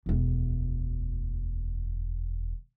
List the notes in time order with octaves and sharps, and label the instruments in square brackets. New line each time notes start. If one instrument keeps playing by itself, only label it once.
[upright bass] E1 D2